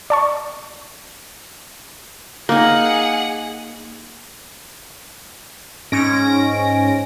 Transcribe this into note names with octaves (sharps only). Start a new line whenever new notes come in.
D5 A5 C#6
A#3 D#4 G#4 F#5
G#2 C#4 A#6 D7